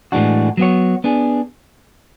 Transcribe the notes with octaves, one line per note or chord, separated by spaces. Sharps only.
A2 E3 G#3 D4 F#4
F#3 B3 F#4 C#5
B3 D4 G#4